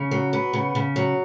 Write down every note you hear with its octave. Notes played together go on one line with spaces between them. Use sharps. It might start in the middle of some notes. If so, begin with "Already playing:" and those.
Already playing: C#3
F#3
B3
C#3
C#3
F#3